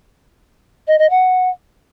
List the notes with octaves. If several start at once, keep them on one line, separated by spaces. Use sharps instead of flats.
D#5
D#5
F#5